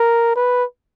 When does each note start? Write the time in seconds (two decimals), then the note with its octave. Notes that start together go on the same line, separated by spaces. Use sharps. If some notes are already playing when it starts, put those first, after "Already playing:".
Already playing: A#4
0.36 B4